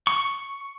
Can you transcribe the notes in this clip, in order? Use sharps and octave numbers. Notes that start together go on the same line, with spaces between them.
C#6